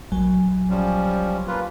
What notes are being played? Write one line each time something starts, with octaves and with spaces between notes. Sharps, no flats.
A#1 F#3 G#5
F3 G3 C#4
A#3 F4 B4